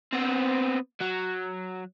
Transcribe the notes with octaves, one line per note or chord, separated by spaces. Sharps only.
B3 C4
F#3